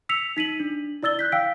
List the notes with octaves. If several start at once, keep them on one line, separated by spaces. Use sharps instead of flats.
E6 B6 C#7 F7
D#4 B6 D#7 F#7
D4
E4 D5 E6 A6 G7
F#6 G6 B6
F5 G5 E6 B6 D7